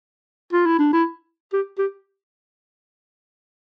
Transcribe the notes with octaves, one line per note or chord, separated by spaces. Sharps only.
F4
E4
D4
E4
G4
G4